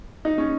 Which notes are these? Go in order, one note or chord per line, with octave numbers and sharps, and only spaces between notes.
D#4
C#4